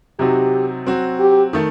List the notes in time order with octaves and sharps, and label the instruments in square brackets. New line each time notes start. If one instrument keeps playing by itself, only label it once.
[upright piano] C3 F#3 C4 D#4 F#4 [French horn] G4
[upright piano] F#3 C4 F#4
[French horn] G4
[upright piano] D#3 A3